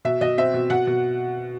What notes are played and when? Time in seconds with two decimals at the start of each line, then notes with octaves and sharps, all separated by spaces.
0.05 B2 E5
0.21 B2 D#5
0.38 C4 E5
0.54 B2
0.70 B2 F#5
0.87 B2